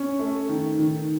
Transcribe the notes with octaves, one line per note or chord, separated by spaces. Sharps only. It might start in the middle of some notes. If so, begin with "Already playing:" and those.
Already playing: C#4
A3
D#3
D#3